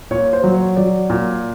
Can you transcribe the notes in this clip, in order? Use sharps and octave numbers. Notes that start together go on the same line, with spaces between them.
A#2 C#5
C5
F#3
C#5
F#3 D5
A#2